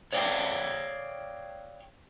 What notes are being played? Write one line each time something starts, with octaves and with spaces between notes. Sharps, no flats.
C#5 D5 F5 G5